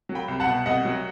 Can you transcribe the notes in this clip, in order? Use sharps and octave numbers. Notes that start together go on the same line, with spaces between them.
F#3
G5 B5
C2
F#5 A5
B2
C2 D#5 F#5
F#3